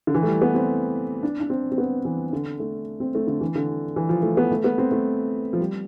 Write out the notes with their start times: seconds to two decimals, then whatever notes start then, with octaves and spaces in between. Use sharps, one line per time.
0.07 D3
0.14 E3
0.23 A3
0.28 G3
0.42 B3
0.55 C4
1.23 D4
1.40 D4
1.50 C4
1.72 C4
1.78 B3
2.05 E3
2.33 D3
2.60 A3
3.00 C4
3.15 A3
3.27 D3
3.41 E3
3.55 D3
3.96 E3
4.09 F3
4.23 A3
4.37 B3
4.51 A3
4.64 B3
4.78 C4
4.91 A3
5.53 F3
5.60 G3